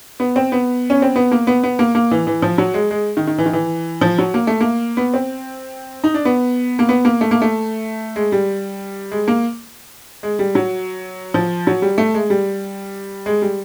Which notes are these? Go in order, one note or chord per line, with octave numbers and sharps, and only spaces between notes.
B3
C4
B3
C#4
C4
B3
A#3
B3
B3
A#3
A#3
E3
E3
F3
F#3
G#3
G#3
D#3
D#3
E3
D#3
E3
F3
F#3
A#3
A3
A#3
B3
C4
D#4
D4
B3
A#3
B3
A#3
A3
A#3
A3
G#3
G3
G#3
A#3
G#3
G3
F#3
F3
F#3
G3
A3
G#3
G3
G#3
G3